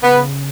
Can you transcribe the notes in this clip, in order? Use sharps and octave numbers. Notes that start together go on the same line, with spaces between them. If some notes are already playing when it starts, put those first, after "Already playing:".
C#3 B3